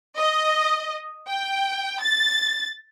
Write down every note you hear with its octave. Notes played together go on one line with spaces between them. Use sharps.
D#5
G5
A6